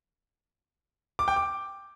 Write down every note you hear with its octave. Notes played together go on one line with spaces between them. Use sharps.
D6
G5
D6